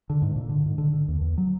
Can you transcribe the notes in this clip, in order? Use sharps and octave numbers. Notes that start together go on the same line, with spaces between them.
D3
G#2
A#2
D3
G#2
D3
D3
D#2
E2
F#3